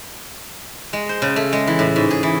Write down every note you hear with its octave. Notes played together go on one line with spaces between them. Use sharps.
G#3
C5
C#3
A3
G#3
E3
A2
G#2
G#4
E3